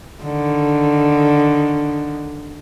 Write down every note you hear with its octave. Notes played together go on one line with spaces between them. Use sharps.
D3 D#3